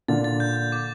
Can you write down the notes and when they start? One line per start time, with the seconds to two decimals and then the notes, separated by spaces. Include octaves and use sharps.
0.08 A#2 D3 A6
0.24 A6
0.40 G6
0.56 G6
0.72 D6